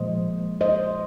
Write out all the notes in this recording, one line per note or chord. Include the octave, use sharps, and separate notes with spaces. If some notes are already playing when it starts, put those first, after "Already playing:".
Already playing: A#2 F3 G#3 C5 D#5
C5 D#5